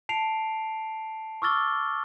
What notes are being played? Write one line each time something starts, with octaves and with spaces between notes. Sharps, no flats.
A5 C7 D7 F7
C#6 D6 E6 F6 A6 G7